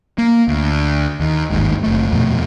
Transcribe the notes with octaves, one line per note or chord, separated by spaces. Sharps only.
A#3
D2
D#2
G1 D#2 G#2
F#1 A3
D#1 F2 B2 A3